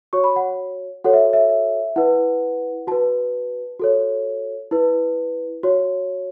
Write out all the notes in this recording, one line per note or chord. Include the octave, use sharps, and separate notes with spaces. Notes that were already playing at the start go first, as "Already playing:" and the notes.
F#4 C#5 C#6
B5
F#5
F#4 A4 C#5 F#5
E5
E5
E4 B4 F#5
F#4 B4 A5
F#4 A4 C#5
E4 B4
F#4 C#5